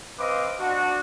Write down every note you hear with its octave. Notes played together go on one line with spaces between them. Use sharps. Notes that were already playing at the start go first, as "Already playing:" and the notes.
C4 B4 C5 D#5 F5 D6
D4 F#4